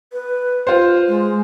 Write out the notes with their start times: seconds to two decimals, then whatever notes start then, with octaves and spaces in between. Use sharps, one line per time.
0.13 B4
0.67 F4 C5
1.08 G#3